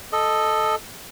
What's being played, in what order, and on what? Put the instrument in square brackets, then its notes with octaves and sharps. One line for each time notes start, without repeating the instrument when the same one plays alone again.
[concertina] A4 D#5